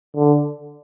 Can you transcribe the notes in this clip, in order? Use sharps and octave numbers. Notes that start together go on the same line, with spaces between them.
D3